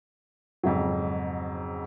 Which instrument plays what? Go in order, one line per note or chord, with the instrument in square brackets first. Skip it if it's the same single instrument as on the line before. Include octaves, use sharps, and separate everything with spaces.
[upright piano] F2 G#2 C#3 F#3